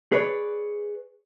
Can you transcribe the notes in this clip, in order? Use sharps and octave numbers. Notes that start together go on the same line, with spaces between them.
G#4 B4 C#5 D5